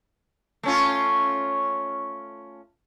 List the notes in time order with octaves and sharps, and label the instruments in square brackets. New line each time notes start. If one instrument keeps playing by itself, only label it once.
[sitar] A3 C#4 F4